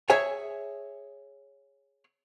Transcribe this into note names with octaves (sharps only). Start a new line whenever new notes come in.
G#4 C#5 E5 G#5